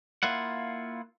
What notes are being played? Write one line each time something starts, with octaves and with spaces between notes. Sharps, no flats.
A#3 E4 F4 F#5